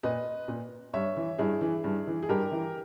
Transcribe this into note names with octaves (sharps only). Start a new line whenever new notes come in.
A#2 B4 D#5
A#2
G2 C#5 E5
E3
G2 E4 G#4
E3
G2
E3
G#4
G2 G4 A#4
E3